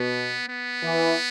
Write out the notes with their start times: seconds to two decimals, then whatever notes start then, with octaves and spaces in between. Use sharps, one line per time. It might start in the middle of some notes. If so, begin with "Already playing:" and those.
Already playing: B2 B3
0.48 B3
0.83 E3